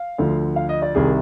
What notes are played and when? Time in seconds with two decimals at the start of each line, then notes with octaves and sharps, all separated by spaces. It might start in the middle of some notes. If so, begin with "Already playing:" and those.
Already playing: F5
0.18 D2 D3 F3
0.56 F5
0.69 D#5
0.82 D5
0.95 C2 C3 D#3 G#4